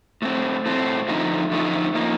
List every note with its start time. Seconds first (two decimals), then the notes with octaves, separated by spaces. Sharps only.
0.22 A2 A3 C4
0.66 A2 A3 C4
1.08 D3 F3 A3 D#4
1.51 D3 F3 A3 D#4
1.95 F3 A#3 D#4